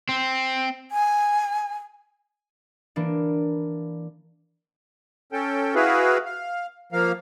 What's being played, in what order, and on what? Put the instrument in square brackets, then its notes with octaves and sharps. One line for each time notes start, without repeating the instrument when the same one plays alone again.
[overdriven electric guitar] C4
[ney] G#5
[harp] E3 A#3 D4
[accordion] C#4 A4 G5
E4 F#4 G#4 B4 F5
F5
F3 A#3 F5